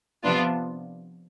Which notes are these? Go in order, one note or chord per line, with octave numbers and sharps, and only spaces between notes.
C3 F3 B3 D4 F4